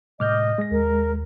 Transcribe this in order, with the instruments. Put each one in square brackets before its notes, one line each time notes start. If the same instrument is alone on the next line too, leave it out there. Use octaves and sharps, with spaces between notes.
[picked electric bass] A2 C3 G#3 [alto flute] D#5 [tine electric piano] D6 F6 G6
[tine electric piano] G#3 A#6
[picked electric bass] D#2 [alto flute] A#4